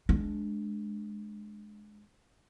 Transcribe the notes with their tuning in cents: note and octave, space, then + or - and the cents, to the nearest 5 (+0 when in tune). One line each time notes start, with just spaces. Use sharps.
G#3 +15 D4 +0